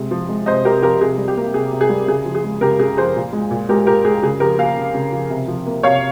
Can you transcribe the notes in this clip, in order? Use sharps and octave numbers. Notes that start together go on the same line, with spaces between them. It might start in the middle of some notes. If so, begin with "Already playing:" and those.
Already playing: C3 G#3
F3
G#3
C3 C5 D#5
C3 G4 A#4
F3 G4 A#4
C3 G#4
G3
G4
A#3
C3 G#4
C3
G#4
G3
C#3 G#4
F3
G#4
G#3
C#3 G4 A#4
C#3 G#4
F3 G#4 C5
A#2
G#3
A#2
G#3 G4 A#4
A#2 G4 A#4
G#3 G#4
C#3 G#4
F3 G4 A#4
A#3 F5 G#5
C#3
C#3
F3
C3
F3
A#3
C3 C#5 F5